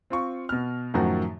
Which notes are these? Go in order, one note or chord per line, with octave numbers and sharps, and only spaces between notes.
C4 F4 C#6
B2 F6
F#2 A2 D#3 F3 F#4